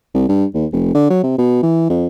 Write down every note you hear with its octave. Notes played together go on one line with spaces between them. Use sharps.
C2
G2
D#2
F1
D3
F#3
C3
B2
E3
F2